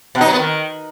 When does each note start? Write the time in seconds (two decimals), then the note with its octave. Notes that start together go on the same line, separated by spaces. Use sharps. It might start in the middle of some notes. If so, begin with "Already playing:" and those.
0.15 B2
0.21 D#4
0.27 F#3
0.33 B3
0.39 D#3